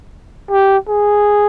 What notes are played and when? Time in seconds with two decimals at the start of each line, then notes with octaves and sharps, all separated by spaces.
0.51 G4
0.89 G#4